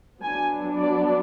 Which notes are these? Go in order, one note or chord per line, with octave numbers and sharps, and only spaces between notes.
F#3 B3 D4 G#5
D5